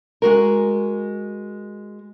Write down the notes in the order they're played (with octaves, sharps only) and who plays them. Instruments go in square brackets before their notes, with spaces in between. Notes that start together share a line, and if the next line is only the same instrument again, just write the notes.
[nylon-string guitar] G#3 F#4 A#4